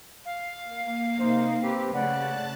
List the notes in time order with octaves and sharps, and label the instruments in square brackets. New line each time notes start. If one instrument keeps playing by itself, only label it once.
[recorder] F5
[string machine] A#3
[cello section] C3 D#4 [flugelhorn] C5
[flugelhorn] C4 [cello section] G4 B4
[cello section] C#3 A3 [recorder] D5 [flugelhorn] F#5 [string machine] A5 F#6 A6